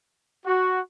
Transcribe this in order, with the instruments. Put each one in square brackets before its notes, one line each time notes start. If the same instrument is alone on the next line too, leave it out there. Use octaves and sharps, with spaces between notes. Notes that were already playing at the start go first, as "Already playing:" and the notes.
[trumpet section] F#4